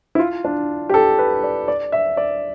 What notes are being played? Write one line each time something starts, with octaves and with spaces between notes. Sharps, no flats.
E4
F4
D4
G4
A4
B4
D5
D5
E5
D5